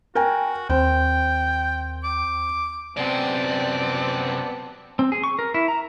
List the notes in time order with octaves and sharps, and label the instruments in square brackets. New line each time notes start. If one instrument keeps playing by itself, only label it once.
[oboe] F#4 [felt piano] A#4 G5 G#5
[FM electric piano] D#2 [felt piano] C4 [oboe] G5
[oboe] D6
[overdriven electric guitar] F#2 C3 [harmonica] B3 C4 A5 [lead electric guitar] D5
[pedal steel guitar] C4
G#4
C#6
A#4
E4
A#5